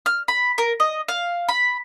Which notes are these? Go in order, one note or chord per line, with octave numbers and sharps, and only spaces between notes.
F6
B5
A#4
D#5
F5
B5